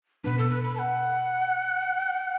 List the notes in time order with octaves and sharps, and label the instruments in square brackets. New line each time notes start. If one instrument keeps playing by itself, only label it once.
[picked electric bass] B2 B3 D4 [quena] B4
[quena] A4
B4
B5
A5
F#5